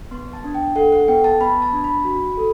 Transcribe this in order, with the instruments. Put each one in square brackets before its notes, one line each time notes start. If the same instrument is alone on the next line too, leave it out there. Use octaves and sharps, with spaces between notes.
[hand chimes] B3 C6
A5
D4
G5
A4 F#5
F#5
B3 G5
A5
B3 B5
A5
D4
B5
F#4
A4